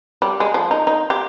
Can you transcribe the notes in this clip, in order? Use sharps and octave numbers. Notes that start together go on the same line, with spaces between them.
G3
G#3
F3
D#4
D#4
G4